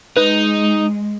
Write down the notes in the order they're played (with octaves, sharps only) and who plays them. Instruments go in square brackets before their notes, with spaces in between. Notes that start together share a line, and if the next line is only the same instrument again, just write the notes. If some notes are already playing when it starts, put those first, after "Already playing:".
[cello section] G#3 [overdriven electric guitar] D#4 [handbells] B4